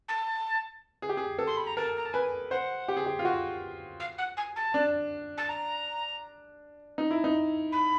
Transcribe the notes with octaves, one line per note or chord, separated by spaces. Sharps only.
A5
G#4
G4
G#4
A4
C6
B5
A#5
A#4 A5
A#5
A5
B4 G#5
C5 F#5
G4
G#4
G4
F4
F#4
F5
F#5
G#5
A5
D4
A5
A#5
D#4
E4
D#4
B5